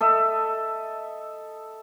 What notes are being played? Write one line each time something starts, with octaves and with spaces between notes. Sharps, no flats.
A4 D#5 E5